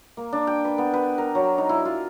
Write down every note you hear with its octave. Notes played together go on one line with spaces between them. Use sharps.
A#3
D4
G5
B4
B3
B4
A#4
F#3
D#4
E4
F4